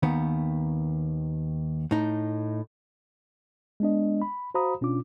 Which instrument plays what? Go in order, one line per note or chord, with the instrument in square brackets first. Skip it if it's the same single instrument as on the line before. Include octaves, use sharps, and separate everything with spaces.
[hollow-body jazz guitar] D#2 D#3 B3
A2 D#4
[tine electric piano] G#3 B3 D4 D#5
B5
F#4 C5 F5 A#5 B5 D#6
B2 C#4 D4 F4 D6